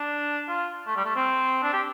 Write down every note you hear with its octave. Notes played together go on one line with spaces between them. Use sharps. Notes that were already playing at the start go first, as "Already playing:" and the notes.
Already playing: D4
F4
A3
G3
A3
C4
D4
G4